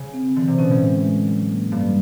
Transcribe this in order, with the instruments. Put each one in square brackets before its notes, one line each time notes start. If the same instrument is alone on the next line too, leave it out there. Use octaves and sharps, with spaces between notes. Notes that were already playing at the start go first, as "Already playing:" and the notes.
Already playing: [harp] C#3
[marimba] C4
[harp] D3 [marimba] E3
[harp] C3
[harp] B2 [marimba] C#4
[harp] A2
[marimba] G#3
G#3
F#3
A#3
[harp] G2 [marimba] A#3